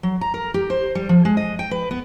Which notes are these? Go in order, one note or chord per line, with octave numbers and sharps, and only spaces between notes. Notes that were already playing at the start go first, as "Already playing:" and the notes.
F#3
A#5
A#4
G4
C5
G3
F3
G#3
D#5
G5
B4
B3